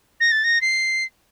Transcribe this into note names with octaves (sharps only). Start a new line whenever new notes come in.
A#6
A6
A#6
C7